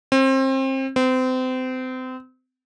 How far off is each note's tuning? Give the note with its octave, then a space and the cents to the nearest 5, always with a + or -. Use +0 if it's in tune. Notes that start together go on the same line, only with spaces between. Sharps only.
C4 +30
C4 -30